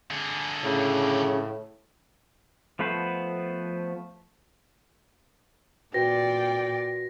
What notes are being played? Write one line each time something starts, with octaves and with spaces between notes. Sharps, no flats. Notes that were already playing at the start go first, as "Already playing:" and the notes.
D3 G#4
A2 C#3
F3 A3 B3 B4 C5
A#2 F#4 B4 D5 G5 A#6